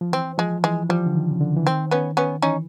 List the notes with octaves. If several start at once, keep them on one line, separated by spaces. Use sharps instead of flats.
F3
E3 C4
F3 G#3
E3 G#3
F3 G3
D3
D#3
C#3
D3
E3
D#3 C4
B3 C#4
B3 C#4
E3 C#4 D#4